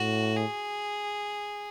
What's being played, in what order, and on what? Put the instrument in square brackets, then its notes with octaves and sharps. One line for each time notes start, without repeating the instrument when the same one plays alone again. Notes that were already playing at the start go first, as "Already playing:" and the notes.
Already playing: [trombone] A2 [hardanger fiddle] F#4
[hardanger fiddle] G#4